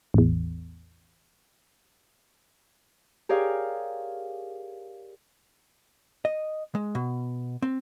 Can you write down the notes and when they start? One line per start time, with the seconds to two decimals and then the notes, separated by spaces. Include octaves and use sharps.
0.14 A1 E2
3.29 G4 G#4 A#4 C#5 D5 F5
6.25 D#5
6.75 G#3
6.95 B2
7.62 C4